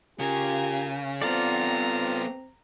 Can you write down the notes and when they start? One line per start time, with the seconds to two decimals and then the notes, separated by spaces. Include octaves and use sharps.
0.19 C#3 F4 G4 A#4 G#5
1.22 B3 C4 F4 A4 D5 A#5